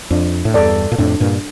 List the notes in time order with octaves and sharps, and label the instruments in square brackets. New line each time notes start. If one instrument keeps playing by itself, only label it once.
[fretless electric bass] F2 [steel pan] D4
[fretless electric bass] A2
[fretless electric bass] E2 G2 [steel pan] A4 D5
[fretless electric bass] A#2
[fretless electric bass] F2 A2 [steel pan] D4
[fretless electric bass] G2 A#2